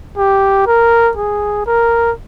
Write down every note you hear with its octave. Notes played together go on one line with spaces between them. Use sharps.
G4
A#4
G#4
A#4